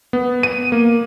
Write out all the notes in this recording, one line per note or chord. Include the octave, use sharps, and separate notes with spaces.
B3
D#7
A#3